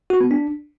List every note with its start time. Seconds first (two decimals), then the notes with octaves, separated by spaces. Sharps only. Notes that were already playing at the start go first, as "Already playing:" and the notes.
0.10 F#4
0.21 B3
0.31 D4